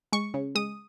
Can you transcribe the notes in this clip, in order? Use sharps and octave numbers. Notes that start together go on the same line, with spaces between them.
G#3 C#6
C#3
G#3 D#6